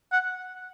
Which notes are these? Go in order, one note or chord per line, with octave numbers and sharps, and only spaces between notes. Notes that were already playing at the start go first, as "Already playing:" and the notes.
F#5